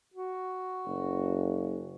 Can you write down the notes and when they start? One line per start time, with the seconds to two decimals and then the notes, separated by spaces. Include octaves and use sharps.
0.14 F#4
0.86 F#1